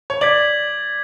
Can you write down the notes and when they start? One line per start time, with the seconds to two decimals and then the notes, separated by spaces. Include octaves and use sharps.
0.10 C#5
0.21 D5 G#6 B6 F#7